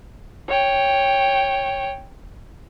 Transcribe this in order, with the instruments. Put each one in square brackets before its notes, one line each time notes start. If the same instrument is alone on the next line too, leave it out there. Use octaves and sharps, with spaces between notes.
[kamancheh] C#5 G5